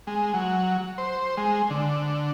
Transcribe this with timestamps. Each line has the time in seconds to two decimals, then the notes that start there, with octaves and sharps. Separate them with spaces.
0.07 G#3
0.34 F#3
0.98 C5
1.37 G#3
1.70 D3